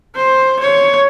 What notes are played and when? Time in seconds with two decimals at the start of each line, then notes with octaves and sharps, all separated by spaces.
0.16 C5
0.60 C#5